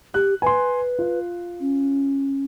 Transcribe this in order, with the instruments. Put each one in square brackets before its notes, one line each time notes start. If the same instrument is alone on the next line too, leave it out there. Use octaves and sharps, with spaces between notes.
[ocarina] G4 [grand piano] F#6
[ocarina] B4 [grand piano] G#5 C6
[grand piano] F4
[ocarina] C#4